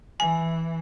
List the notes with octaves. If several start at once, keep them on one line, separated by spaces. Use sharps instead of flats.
E3 G#5